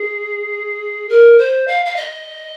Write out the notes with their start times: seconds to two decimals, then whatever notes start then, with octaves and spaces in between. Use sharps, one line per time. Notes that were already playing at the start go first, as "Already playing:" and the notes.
Already playing: G#4
1.09 A#4
1.38 C5
1.67 F5
1.85 F5
1.96 D#5